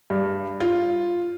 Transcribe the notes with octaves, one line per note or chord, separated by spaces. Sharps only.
G2
F4